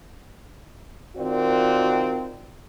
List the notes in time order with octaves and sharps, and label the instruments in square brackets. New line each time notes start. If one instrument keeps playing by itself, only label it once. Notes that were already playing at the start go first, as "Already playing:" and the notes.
[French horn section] D#3 C4 F4 F#4 A#4 D5